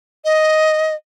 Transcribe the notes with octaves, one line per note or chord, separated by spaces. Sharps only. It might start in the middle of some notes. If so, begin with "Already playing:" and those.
D#5